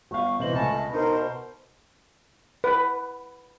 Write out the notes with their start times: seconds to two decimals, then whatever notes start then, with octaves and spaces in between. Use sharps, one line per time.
0.11 G1 F5 C#6
0.39 C3 E3 C5 D#5 F#7
0.53 C#2 A3 C#4 A5
0.81 B2
0.93 D#4 A#4 C5
1.15 C5
2.64 B4